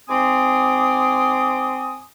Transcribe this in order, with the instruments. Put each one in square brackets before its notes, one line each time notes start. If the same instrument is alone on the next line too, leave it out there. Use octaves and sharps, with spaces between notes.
[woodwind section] G#2 C4 G#5 C6 D6 D#6